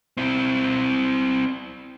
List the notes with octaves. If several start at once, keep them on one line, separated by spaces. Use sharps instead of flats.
C4 E4